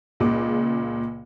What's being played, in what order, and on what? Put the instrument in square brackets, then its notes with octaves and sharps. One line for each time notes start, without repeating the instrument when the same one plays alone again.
[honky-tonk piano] C#2 A#2 C#3 D6